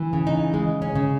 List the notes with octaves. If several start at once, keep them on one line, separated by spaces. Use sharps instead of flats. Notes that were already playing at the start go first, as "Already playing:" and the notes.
Already playing: E3
C#3
D#4
G#3
C#4
C#3